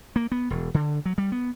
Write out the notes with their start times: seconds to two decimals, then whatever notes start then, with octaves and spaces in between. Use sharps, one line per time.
0.16 A#3
0.32 B3
0.50 E1
0.74 D3
1.06 F#3
1.18 G3
1.32 B3